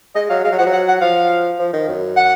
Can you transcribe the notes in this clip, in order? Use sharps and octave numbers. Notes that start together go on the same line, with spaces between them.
G#3 D#5
F#3 F5
G#3 F5
F#3
F3 F#5
F#3
F#5
F#5
F3 F5
F3
D#3
F#2
F#5